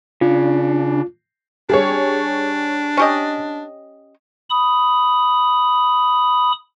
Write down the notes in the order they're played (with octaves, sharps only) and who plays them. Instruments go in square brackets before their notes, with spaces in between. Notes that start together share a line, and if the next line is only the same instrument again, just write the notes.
[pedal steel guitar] C#3 [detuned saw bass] D4 [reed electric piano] F4
[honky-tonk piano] G3 G#4 C#5 [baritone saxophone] D4
[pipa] C#4 G4 D#5
[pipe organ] B5 D#6